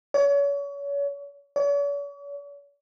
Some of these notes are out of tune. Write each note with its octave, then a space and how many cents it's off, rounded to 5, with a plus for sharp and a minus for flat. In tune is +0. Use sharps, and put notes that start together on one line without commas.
C#5 +35
C#5 +45